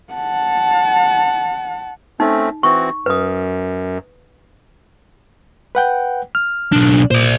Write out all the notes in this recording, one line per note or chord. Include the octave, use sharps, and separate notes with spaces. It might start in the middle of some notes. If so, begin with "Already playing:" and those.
F#5 A5
A3 C4 C#4 D#4
E3 C4 F#4 C#6
F#2 B4 D#6
B4 F#5 G5
F6
B1 D4
A#2 C5 D5